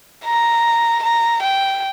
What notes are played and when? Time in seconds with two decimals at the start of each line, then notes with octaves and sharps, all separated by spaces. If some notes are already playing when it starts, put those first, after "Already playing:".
0.25 A#5
1.03 A#5
1.43 G5